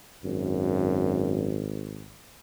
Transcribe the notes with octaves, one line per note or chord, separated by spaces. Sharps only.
G#1 F#2